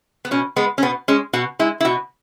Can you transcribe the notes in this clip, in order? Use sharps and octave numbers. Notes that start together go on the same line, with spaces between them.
B3
B2 C#4
G#3 B3
C#4
B2 B3
G#3 C#4
B2 F#4
G#3 E4
E4
B2 F#4